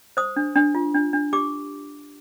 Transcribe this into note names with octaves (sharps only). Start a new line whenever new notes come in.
C5 D#6
D4
D4
F4
D4
D4
G4 D6